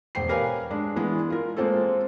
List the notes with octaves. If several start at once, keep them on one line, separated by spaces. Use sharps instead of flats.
E1 C5 G5 C7
G4 A#4 B4 C#5 F5 G#5
G#3 D4
E3 G#3 B3
F4 A#4
G#3 A#3 C4 F4 A4